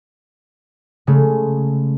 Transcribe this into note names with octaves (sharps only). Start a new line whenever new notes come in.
C#3 G#3 A3